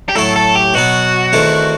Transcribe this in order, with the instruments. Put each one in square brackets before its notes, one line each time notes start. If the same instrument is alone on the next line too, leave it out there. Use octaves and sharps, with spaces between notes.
[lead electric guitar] G4
[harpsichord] A2 F#3 A3 E4 [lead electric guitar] A4
[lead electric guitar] A4
G4
[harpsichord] B2 F#3 B3 [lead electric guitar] F#4
[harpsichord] E2 D#3 A3 C4 E4